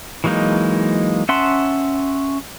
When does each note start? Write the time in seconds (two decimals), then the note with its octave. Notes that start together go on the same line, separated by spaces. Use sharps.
0.24 E3 F#3 G#3 A#3 D#4
1.29 C#4 E5 F#5 A5 C6